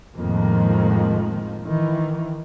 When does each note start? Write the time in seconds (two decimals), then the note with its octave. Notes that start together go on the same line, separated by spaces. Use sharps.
0.15 F2 A2 D#3 F3 G#3 A#3
1.63 D#3 E3